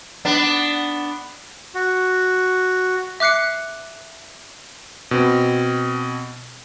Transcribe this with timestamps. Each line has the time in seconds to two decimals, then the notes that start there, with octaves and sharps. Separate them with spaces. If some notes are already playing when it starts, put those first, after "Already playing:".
0.25 B3 D4
1.75 F#4
3.20 E5 D6 F#6 C7 C#7
5.11 B2 C4